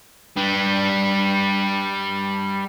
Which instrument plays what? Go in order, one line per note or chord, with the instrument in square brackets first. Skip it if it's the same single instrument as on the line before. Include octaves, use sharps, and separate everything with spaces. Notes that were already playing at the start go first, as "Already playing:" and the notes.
[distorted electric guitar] G3 D4